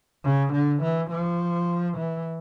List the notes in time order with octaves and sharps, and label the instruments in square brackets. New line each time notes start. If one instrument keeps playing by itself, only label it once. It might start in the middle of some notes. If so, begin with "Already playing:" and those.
[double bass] C#3
D3
E3
F3
E3